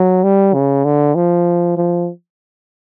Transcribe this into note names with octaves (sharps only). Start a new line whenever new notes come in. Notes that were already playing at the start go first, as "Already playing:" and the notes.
Already playing: F#3
G3
C#3
D3
F3
F3